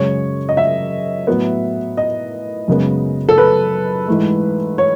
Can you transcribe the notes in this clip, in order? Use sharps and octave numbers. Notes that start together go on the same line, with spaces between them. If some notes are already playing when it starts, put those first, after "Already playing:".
Already playing: F#2 C#3 G#3 C#5
D#5
E5
A2 F#3 B3
D#5
F#2 C#3 G#3 B3
A4
B4
G#2 E3 A3
C#5